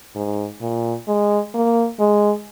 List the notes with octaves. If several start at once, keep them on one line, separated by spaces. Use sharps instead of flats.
G#2
A#2
G#3
A#3
G#3